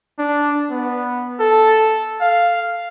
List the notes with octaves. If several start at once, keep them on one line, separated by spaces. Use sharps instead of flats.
D4
B3
A4
F5